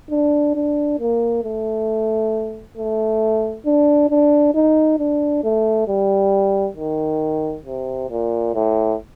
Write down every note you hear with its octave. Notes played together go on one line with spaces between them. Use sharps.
D4
D4
A#3
A3
A3
D4
D4
D#4
D4
A3
G3
D#3
C3
A#2
A2